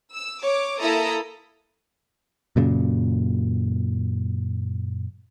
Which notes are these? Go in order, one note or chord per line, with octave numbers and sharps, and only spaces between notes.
E6
C#5 D6
A#3 E4 A4 A#5 D#6
F#2 A#2 C#3